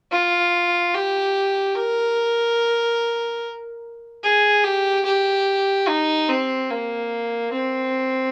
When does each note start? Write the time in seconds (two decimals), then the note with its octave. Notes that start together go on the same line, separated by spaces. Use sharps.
0.12 F4
0.94 G4
1.76 A#4
4.24 G#4
4.64 G4
5.06 G4
5.89 D#4
6.29 C4
6.70 A#3
7.53 C4